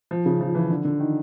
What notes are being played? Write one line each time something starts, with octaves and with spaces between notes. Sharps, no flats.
F3
C#3
F3
E3
D3
D3
D#3